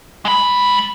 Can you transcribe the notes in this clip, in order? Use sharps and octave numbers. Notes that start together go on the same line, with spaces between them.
G#3 B5